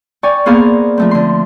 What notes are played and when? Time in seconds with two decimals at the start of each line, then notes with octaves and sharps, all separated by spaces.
0.23 D5 G5 G#5 C#6
0.46 A#3 B3 G#4 C5 D5 F5
0.98 F3 A3 C4
1.11 D3 C6